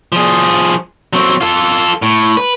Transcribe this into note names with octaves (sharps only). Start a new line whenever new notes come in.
F3 G#4
F#3 C4
F4 A4
A2
B4